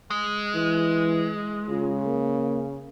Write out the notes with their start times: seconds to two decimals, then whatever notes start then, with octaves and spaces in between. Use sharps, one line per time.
0.10 G#3
0.55 E3
1.69 C#3 F4
2.04 A#3